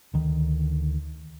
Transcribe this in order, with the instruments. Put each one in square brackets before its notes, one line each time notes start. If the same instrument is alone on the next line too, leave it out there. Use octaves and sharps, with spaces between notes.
[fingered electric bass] D2 D#3